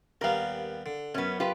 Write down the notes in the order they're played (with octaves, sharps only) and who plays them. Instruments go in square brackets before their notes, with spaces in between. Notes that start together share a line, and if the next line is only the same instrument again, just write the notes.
[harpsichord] D#2 G3 B3 [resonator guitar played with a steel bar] A#4 F5
[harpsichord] D3
[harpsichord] F#2 [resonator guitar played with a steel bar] B3 C#4
[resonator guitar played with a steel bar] F4 G4 B4